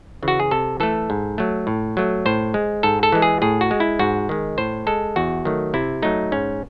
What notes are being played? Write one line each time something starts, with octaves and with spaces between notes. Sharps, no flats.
C#3 E3
F#4
G#4
C3 A4
E3 A3 A4
G#2
F#3 A3
A2
F#3 A3
A2 C5
G#3
G#2 A4
A4
E3 G#3
G#4
A2 G#4
F#4
G#3
E4
G#2 F#4
D#3 G#3
A2 C5
G#3 A4
E2 F#4
D#3 F#3 A3
C3 E4
F#3 A3 D#4
G#2 C#4